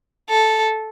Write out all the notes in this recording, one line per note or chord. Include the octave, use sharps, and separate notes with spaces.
A4